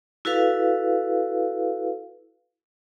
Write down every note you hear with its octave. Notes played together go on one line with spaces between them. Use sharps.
E4 F#4 A4 B4 F5